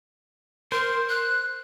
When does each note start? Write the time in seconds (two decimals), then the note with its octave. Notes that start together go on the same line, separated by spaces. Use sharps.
0.72 A#4 C5
1.09 F#6